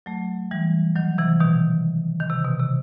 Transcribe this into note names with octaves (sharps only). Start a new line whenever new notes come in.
F#3 A3
E3 G3
D#3 F#3
C3 E3
B2 D#3
D#3
C3
B2
C3